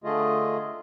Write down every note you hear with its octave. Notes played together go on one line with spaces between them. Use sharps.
D3 A3 F4 G#4 D#5